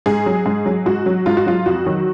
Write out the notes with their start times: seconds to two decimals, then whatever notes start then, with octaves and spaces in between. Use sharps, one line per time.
0.06 G#2 G#4
0.26 F#3
0.46 G#2
0.66 F#3
0.86 G#2 F#4
1.06 F#3
1.26 G#2 F4
1.37 F#4
1.46 F#3 F4
1.66 F2 F#4
1.86 D#3 F#3